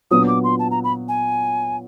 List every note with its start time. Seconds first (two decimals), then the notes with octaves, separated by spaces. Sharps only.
0.11 A#2 F#3 B3 D4 F4 D#6
0.27 D6
0.44 C6
0.59 A5
0.71 A#5
0.84 B5
1.08 G#5